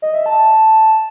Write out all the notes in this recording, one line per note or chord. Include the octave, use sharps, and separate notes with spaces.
D#5
E5
A5
A5